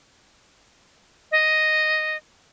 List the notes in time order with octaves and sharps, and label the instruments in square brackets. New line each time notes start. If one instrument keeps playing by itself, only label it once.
[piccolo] D#5